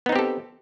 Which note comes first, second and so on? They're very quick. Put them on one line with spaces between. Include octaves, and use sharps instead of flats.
B3 D#4 C4 G4 A4